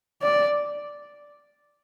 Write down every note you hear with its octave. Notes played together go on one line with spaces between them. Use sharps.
D5